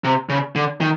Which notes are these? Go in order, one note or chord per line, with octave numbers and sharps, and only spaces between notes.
C3
C#3
D3
D#3